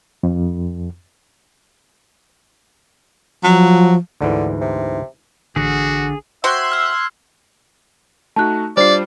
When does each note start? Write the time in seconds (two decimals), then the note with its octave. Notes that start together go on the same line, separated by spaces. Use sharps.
0.23 F2
3.44 F3 F#3
4.21 D2 G#2 D3 E3
4.61 C3
5.56 A1 D3 F#4 G#4
6.44 F#4 C5 E5 G5 C6 F#6 G#6
6.72 E6 F6
8.36 A3 D#4 F#4 A5 F#6
8.77 G3 D4 F4 C5 D5 C7